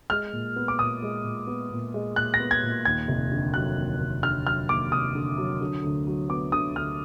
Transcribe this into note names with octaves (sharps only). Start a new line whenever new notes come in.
G#3 F6
A#2
B3
D6
A#2 D#6
G#3
A#2
B3
A#2
G#3
A#2 F#6
A#6
B3
G#6
A#2
D#2 G#6
F1
D3
F#3 F#6
D#2
F1
D3 F6
F#3 F6
D#2 D6
F1 D#6
D3
F#3
D3
D2
F#3
B3 D6
D3 D#6
D2 F6